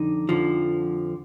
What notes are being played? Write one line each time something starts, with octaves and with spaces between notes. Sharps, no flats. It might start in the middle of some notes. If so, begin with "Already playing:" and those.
Already playing: F2 D3 D#4
F2 D3 F3